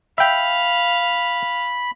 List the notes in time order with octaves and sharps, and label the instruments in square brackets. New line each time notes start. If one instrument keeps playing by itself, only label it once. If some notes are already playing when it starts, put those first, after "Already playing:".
[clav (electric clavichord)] E5 G5 [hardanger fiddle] F5 [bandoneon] B5